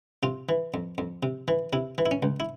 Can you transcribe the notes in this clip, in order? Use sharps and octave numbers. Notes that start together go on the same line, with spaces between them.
C3 F4
E3
F2
F2
C3
E3
C3 E4
E3
E4
C#4
C#2
E4